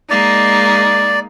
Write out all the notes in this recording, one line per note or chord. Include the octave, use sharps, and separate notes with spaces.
G#3 A#3 D#4 D5